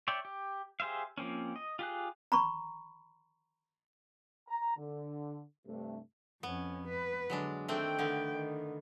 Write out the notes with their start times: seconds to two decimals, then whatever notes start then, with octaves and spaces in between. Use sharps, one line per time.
0.08 C#5 D5 E5 G5
0.25 G4
0.80 G4 G#4 C5 E5 F5
1.18 F3 A#3 C4 C#4
1.56 D#5
1.79 F4 G4 G#4 F#6
2.32 A#5 B5 C#6
4.48 A#5
4.77 D3
5.66 G2 C3 A3
6.43 F2 B3 C#4
6.88 B4
7.30 D3 F#3 G#3 D4
7.68 D#3 A3 C4 D4 G5
7.99 D3 B3
8.33 D#3